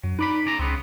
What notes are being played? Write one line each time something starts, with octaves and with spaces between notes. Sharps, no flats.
F#2 F#3
D#4 B4 D5 B5
C#3 D5 A#5
C#2 C#3 B3 C4